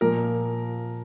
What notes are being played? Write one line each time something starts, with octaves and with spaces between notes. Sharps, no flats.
A#2 F3 A#4